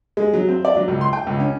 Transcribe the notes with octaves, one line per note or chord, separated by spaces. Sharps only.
G#3
F#3
C4
D5
F#3
C#2
C6
G5
C#2
C#4